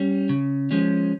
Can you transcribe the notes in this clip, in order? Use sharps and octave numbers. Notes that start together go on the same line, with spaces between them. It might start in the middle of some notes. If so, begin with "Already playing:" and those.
Already playing: G3 C#4
C#3
F3 G#3 C#4